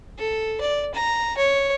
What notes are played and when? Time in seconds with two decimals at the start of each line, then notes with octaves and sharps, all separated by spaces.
0.18 A4
0.61 D5
0.94 A#5
1.37 C#5